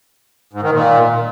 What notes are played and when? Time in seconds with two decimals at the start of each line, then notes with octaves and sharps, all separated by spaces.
0.53 G#2
0.62 D#3
0.72 A#2